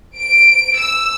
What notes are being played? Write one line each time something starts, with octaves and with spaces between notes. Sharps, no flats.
D7
E6